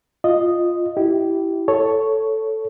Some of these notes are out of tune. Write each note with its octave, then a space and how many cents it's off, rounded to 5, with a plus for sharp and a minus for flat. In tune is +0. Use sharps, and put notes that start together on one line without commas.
F4 +0 D#5 -5
E4 +5 G4 -20
A4 +0 C#5 +0